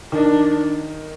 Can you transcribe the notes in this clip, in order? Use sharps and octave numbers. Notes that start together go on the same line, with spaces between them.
D#3 D4